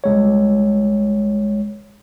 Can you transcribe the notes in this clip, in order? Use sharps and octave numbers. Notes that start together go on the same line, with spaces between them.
C2 G#3 C#5